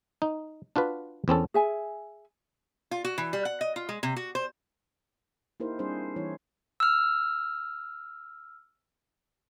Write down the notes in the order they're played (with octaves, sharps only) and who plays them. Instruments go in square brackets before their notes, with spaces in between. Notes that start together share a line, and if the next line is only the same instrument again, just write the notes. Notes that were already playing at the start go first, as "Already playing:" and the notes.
[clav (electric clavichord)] D#4
D4 F4 F#4 B4
E2 C4 C#4 A4
[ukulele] G#4 E5 G#5
[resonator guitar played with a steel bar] F4
F#4
E3
G3
F#5
D#5
F4
G#3
C3
F#4
C5
[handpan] A#3 D#4 E4 G4 A#4 C5
G3 C4 D4 G#4 C5
E3 G3 E4 C#5
[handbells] E6 F6